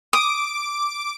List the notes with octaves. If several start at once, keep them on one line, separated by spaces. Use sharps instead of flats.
D6 D#6 D7